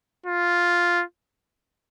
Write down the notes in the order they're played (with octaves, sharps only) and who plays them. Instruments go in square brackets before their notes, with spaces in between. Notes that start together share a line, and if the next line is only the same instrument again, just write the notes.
[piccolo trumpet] F4